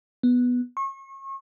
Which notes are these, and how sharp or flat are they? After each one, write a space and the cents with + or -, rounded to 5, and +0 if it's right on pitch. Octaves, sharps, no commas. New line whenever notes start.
B3 -5
C#6 -35